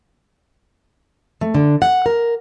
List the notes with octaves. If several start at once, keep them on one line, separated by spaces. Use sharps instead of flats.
A3
D3
F#5
A#4